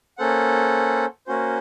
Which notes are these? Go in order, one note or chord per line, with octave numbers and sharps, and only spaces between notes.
A#3 C#4 A4 C5 F#5
A#3 C#4 F#4 C5